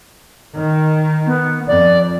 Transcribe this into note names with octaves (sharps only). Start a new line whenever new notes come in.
D#3
B3
F2 D5